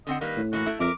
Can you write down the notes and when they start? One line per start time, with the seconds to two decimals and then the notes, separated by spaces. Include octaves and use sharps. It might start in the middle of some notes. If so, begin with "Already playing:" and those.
0.07 D3 C4 D#5 F#5
0.21 D#3 G3 A#3 B4
0.37 A2
0.53 D3 E3 A#3 F#4
0.66 A3 E4
0.80 F2 A#4 E5 A#5 D6